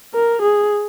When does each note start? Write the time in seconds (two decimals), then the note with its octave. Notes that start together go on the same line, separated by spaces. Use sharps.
0.15 A#4
0.42 G#4